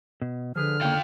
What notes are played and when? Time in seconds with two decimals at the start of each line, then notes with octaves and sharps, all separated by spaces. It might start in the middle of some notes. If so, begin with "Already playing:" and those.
0.22 B2
0.56 D3 F3 G#4 B4 F6
0.81 C#3 A#3 F4 G5